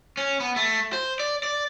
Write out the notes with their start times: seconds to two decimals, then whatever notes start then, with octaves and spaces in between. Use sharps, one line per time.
0.17 C#4
0.40 B3
0.56 A3
0.93 C5
1.20 D5
1.43 D5